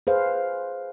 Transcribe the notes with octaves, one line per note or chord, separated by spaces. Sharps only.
G#4 B4 C5 F5